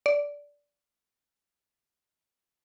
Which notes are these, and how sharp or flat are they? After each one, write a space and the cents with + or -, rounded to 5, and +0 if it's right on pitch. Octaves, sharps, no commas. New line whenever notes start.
D5 -15